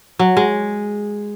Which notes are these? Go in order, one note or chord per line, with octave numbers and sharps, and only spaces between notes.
F#3
G#3